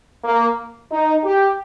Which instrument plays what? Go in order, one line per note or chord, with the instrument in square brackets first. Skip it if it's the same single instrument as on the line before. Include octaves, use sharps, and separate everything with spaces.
[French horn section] A#3
D#4
G4